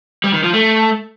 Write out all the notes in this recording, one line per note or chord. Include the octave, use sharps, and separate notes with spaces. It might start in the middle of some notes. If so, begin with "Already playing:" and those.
G3
D#3
F3
A3